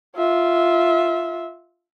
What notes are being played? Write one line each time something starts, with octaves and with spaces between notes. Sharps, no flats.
F4 E5